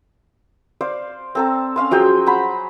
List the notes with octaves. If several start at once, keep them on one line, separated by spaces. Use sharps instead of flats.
C5 D5 F5
C4 A4 A#5
C#4 F5 C6
F3 F#3 G#4 G5
C5 F#5 A#5 B5